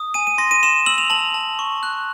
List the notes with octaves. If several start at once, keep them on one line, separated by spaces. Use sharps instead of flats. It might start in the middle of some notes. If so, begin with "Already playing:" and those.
Already playing: D#6
G#5 D#7
D#7
C6 A#6
D#7
C6 E7
E6 F#7
F7
A5 F#7
A5
C#6
F#6